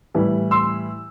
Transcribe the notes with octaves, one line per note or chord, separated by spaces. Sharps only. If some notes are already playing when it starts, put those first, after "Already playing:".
A2 E3 G3
C6 E6